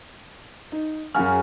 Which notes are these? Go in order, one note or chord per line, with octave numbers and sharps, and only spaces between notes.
D#4
F#2 C#3 F#3 C#4 F6